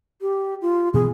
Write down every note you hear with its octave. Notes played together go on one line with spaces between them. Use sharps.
G4
F4
B2 E3 B3 G#4